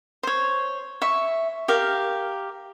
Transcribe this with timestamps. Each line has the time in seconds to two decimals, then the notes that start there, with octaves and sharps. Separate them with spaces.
0.23 C5 C#5
1.02 E5 C#6
1.68 G4 A#4 F5